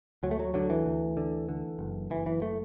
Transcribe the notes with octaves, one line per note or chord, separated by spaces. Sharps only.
D2 F#3
A3
F#3
D3 F#3
E3
D2
D3
D3
F#1
F#1 E3
E3
A3